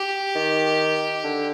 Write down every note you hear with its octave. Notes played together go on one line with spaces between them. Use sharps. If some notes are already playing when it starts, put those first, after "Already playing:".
Already playing: G4
D#3
D3